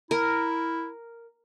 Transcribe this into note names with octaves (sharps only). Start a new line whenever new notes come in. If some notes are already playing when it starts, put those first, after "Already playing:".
E4 A#4